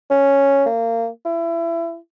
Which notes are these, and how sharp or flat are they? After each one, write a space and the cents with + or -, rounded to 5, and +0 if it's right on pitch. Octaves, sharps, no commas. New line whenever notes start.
C#4 +0
A#3 -25
E4 +25